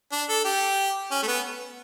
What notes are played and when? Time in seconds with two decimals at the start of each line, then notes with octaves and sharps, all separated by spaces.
0.12 D4
0.29 A4
0.45 G4
1.11 C#4
1.23 A3
1.28 B3